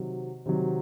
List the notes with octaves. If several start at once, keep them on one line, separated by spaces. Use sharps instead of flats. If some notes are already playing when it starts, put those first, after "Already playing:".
Already playing: C3 D#3 F#3
C3 D#3 F#3